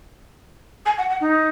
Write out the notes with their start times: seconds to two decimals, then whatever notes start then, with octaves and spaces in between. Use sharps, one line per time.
0.86 G#5
0.98 F#5
1.10 F#5
1.21 D#4